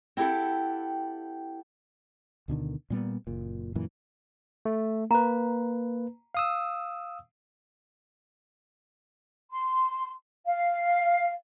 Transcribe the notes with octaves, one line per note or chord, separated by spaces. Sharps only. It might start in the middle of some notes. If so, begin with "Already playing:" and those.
C4 E4 G4 A4 F#5
D2 B2 D3 D#3
A#2 G3 B3
F#1 A#2
F#2 A#2 E3
A3
A#3 B4 A#5
F5 D#6 E6
C6
F5